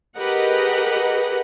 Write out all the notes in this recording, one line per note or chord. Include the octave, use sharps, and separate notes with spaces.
G4 G#4 A#4 B4 D#5 F#5